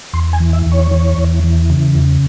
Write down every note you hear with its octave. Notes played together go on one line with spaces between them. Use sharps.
E2 C6
G#5
E3
E5
E2
C#5
E3
E2
E3
C#3
E2